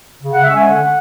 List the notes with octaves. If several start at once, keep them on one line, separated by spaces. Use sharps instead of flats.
C#3
F#5
G#3 C#4 E5
G#5
D3 F#5